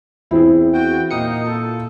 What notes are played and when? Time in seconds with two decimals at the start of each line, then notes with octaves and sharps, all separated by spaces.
0.31 E2 C4 E4 G#4
0.73 F#4 G5
1.11 A#2 A#3 D#4 D#6 C#7
1.44 F4 A4